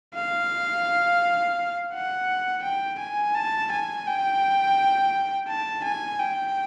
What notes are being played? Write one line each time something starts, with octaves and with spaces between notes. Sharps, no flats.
F5
F#5
G5
G#5
A5
G#5
G5
A5
G#5
G5